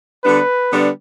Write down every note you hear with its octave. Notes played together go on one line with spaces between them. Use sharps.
D3 G3 B3 D4 B4
D3 G3 B3 D4